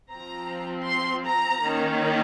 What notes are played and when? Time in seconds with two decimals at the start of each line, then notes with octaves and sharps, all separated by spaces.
0.12 F3 C4 A#5
0.87 C6
1.24 A#5
1.61 D#3 A#3 C#4